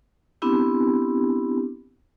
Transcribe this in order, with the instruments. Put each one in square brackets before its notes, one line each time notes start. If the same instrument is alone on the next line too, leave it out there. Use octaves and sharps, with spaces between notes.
[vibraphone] B3 C4 D4 E4 G4